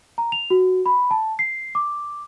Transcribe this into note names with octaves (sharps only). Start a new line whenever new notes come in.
A#5
F7
F#4
B5
A5
C7
D6